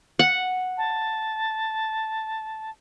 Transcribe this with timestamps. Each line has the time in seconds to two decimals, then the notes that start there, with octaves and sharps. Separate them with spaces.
0.19 F#5
0.78 A5